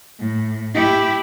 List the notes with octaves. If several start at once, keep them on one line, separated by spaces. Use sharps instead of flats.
A2
E4 G4